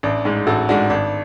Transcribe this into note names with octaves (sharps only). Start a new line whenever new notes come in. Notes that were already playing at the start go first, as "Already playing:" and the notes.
A1 D4
G#2 G#3
A1 F#4 A4
G#2 G#3 D4 F#4
G#1 D4